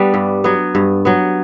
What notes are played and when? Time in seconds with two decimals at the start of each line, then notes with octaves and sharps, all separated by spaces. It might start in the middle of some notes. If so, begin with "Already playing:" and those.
Already playing: G3 B3 D4
0.14 G2
0.44 F#3 B3
0.75 G2
1.05 F#3 B3